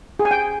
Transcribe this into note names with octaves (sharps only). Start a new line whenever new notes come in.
G#4
G#5
G5